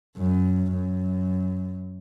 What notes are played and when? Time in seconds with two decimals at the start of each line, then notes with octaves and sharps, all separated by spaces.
0.17 F#2
0.72 F#2